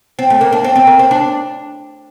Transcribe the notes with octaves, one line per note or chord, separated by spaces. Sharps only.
C4
A3
A#3
D4
C4
C4
A#3
C4
D4